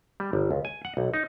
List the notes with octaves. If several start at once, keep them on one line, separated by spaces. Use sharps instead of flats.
G3
G1
C#2
G#5
F#5
B1
D#4